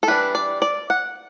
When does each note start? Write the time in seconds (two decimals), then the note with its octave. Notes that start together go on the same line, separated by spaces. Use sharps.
0.03 A4
0.08 E3 G3 D4 B4
0.35 D5
0.62 D5
0.90 F#5